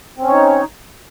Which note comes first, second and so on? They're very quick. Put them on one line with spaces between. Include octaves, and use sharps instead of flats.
C4 C#4 C#5 D#4